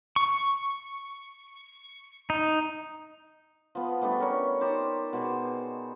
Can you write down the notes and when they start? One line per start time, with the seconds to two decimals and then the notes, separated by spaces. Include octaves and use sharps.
0.16 C#6
2.30 D#4
3.75 F3 B3
4.01 G3 A3 B3 D4
4.20 C#4 A#4 C#5
4.61 D#4 G4 C5 D5
5.13 B2 G#4 C5